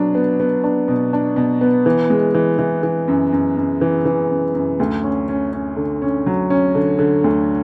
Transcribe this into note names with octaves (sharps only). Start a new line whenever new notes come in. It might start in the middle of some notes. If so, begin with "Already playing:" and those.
Already playing: B2 F#3 B3 D4
B3
B3
D4
B2
D4
B2
B3
E3
G#3
E3
E3
E3
F#2
F#2
F#2
E3
E3
F#2
F#2
D2
C#4
C#4
C#4
D3
C#4
F#3
C#4
D3
D3
D2